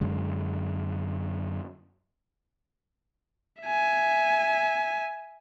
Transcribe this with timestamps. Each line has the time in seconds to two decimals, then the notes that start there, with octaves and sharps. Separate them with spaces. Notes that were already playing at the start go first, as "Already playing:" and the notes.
0.01 F#2 D3 G#3
3.62 E5 G#5